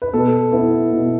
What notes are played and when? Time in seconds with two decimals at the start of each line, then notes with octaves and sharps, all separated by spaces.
0.02 B4
0.13 B2 A4
0.52 B3 E4
0.92 B2